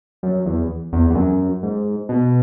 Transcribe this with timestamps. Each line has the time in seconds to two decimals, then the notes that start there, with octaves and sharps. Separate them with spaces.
0.23 F#2
0.46 E2
0.93 E2
1.10 E2
1.15 F#2
1.63 G#2
2.09 B2